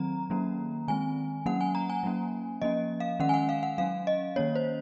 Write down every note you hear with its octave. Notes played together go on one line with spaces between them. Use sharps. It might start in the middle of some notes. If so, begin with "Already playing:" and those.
Already playing: D#3 F#3 C4 A#5
D#3 F#3 A#3 C#4
D#3 G#3 C4 G#5
F#3 A#3 C#4 F#5
G#5
A#5
G#5
F#3 A#3 C#4
F3 A#3 C#4 D#5
F5
D#3 G#3 C#4 F#5
G#5
F#5
F5
F#5
F#3 C#4 F5
D#5
D#3 A#3 C#4 C#5
C5